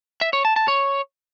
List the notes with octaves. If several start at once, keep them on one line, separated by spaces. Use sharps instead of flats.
E5
C#5
A5
A5
C#5